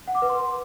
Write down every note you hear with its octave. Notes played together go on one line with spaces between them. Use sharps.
F#5
D6
B4
C6